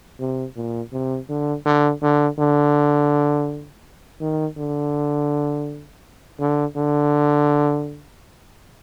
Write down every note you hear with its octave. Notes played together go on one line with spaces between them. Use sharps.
C3
A#2
C3
D3
D3
D3
D3
D#3
D3
D3
D3